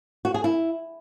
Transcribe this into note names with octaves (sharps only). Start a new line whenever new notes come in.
F#4
G#4
E4